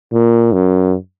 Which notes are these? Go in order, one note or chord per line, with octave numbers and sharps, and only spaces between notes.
A#2
F#2